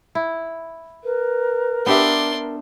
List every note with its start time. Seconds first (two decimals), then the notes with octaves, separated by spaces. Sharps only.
0.15 E4
1.04 A#4 B4
1.86 B3 D4 G4 E5 C6